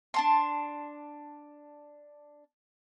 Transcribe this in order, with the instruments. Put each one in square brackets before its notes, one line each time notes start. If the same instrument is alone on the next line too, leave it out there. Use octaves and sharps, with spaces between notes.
[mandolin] D4 A5 C6